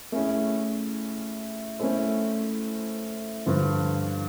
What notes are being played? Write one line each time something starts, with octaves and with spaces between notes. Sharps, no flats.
A3 C#4 E4 G#4
A3 C#4 E4 A4 C5
G2 D3 F3